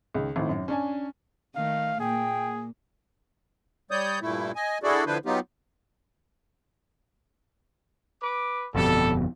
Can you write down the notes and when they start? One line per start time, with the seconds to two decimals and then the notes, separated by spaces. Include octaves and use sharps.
0.15 C#2 D#3
0.36 G#1 A2
0.49 F#2
0.68 C#4 D4 G#5
1.56 D#3 A3 F5
2.00 A#2 A#3 G#4 G5
3.91 G3 C#5 D5 D#6 G6
4.22 G2 A#2 A3 E4
4.55 D#5 G#5
4.83 D4 E4 F#4 G#4 A4 D5
5.06 D3 F3 D4 E4 B4 C5
5.26 F#3 B3 D#4 F4 G4
8.22 B4 D6
8.75 G1 F2 B2 G3 A4